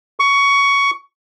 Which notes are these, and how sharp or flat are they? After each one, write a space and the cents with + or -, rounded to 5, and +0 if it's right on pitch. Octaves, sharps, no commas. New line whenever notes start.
C#6 +15